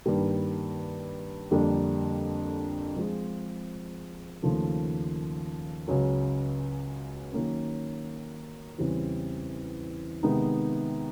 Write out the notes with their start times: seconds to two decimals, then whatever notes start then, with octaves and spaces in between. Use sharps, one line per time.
0.06 G2 D#3 G3 A#3
1.51 F2 D3 G3 A#3 D4
2.96 F3 G#3 C4 F4 G#4
4.42 D#2 C#3 F3 A3
5.88 C#2 C#3 F#3
7.32 D#3 F#3 A#3 C#4
8.78 E2 C#3 E3 G3 C4
10.23 C3 D#3 G#3 B3 D#4